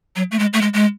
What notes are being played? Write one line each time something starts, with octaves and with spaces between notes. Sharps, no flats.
F#3
A3
G#3
A3
G#3
G#3